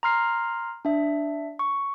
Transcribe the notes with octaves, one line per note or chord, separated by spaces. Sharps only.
A#5 C6 F6 C7
D4 E5
C#6